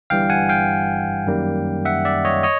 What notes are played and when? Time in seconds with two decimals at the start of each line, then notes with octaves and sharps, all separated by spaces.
0.10 G1 G2 E3 G3 F5 G5
0.29 F#5 G#5
0.49 F5 G5
1.27 F#2 D#3 G3 A#3
1.85 E5 F#5
2.05 D5 E5
2.25 C#5 D#5
2.43 C#5 D#5